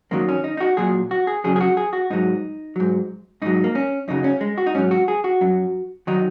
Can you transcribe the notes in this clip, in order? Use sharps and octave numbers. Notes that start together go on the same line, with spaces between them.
F#2 D#3 F#3 A#3
C#4
D#4
D#4
F#4
A#2 F#3 G#4
F#4
G#4
F#2 C#3 F#3 G#4
G#4
F#4
G#4
F#4
G#2 F#3 D#4
G#2 F#3
G#2 F#3 D#4
A#3
C#4
F#2 C#3 F#3 D#4
C#4
G#3
F#4
D#4
G#2 F#3 C#4
F#4
G#4
F#4
F#2 F#3
D#3 F#3 D#4